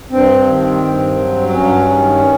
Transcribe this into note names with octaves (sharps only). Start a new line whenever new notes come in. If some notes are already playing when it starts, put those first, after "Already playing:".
G2 C4
D#3
G2
F#3
C4
G2 C#4
D#3